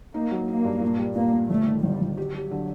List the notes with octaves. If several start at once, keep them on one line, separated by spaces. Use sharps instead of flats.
A#3 D#4
F#3
A#3 D#4
G2
A#2
G3
A#2 A#3
A#2
G1 A3
D#3
G1 G3
G1
F#3 G4
G4
D3